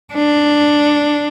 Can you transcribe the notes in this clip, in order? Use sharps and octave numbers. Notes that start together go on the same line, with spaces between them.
D4